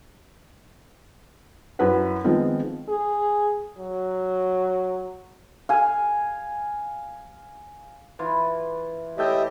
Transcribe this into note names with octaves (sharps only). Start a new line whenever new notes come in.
F#2 E4 F#4 B4 F#5
D#3 F3 G#3 B3 C4 F4
G#4
F#3
F5 G#5
E3 F4
A2 G4 A4 D#5 E5 G5